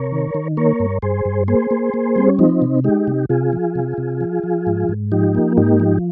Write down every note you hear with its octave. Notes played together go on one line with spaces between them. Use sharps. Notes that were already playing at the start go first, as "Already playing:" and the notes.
Already playing: C3 A#4 C#5
D#3
D#3
A#3 A#4 C#5
G2
G2 G#4 C5
G2
A#3 G#4 C5
A#3
A#3
G3 C4
C#4
F3 C4 D#4
C3
G#3 D#4 G4
C3
C3 F4 G#4
F3
C3
C3
F3
F3
G#2
G#2
F3 D#4 G4
A#3
G#2 D#4 G4
F3